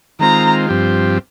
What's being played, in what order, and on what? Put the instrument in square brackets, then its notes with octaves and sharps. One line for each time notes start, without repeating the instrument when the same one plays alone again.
[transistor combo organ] D#3 G#3 C4 F4 [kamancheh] A#5
[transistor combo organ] G2 F3 C4 G4